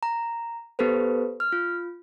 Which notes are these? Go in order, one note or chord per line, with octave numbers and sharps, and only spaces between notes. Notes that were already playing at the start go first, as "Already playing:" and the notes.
A#5
B3 G4 A4 B4 C5
F6
F4